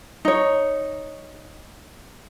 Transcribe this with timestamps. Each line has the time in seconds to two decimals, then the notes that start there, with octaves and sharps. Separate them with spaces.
0.25 D#4 C#5